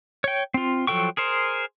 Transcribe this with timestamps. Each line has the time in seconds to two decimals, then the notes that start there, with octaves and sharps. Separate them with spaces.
0.24 C#5 G5
0.54 C4 F4
0.87 F3 F#3 A4 G5 C#6
1.17 G#4 A#4 C5